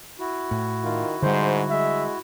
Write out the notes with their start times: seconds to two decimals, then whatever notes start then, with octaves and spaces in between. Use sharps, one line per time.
0.19 E4 F#4
0.51 A2
0.83 D#3 F4
1.22 G#2 D3 G3 C5
1.70 G#3 E5